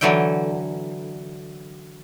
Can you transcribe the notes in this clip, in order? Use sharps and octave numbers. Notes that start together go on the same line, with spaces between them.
D3 E3 F#3 E4 G5